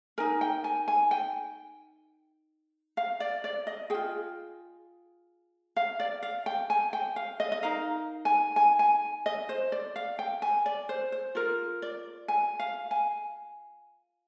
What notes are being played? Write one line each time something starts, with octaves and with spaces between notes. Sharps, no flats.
D#4 A#4 G#5
G5
G#5
G#5
G5
F5
D5
D5
D#5
F4 G#4 G5
F5
D5
F5
G5
G#5
G5
F5
D#5
D#5
D#4 A#4 F5
G#5
G#5
G#5
D#5
C5
D5
F5
G5
G#5
D5
C5
C5
F4 A#4
D5
G#5
F5
G#5